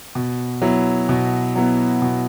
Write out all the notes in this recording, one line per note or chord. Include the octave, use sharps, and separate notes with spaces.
B2
F#3 B3 E4
B2
F#3 B3 E4
B2